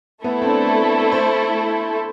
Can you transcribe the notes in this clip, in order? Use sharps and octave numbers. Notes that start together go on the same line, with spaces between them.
A3 B3 E4 A4
C4
D4
C5